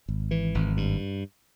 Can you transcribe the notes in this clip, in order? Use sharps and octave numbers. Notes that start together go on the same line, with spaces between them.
G#1
E3
G#1
G2